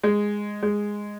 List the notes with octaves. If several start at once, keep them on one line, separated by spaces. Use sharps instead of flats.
G#3
G#3